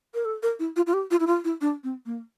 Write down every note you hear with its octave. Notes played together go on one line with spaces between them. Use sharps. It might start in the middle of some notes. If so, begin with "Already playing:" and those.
A#4
A4
A#4
E4
F4
F4
G4
F4
E4
F4
E4
D4
C4
A#3